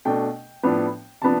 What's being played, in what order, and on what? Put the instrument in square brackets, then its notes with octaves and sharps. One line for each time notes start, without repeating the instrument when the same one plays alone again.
[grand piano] B2 A3 D4 G5
A2 F3 B3 D4
C3 F3 B3 D4 A5